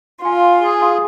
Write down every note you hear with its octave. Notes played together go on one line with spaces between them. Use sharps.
F4 F5 G#5 C6
G#4